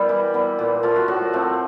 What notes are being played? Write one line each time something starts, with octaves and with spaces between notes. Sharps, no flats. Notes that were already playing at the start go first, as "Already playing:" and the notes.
Already playing: G3 B3 E4 A#4
E3
G3 B3
A#2
F3 A3 F4
F#4
A2 F#4
F3 A3 C4